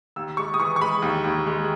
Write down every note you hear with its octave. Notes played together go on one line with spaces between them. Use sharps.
D#2 E6
G#3 C#6
D#6
E3 C#6
C#6
G#3 B5
D#2
D#2
G#3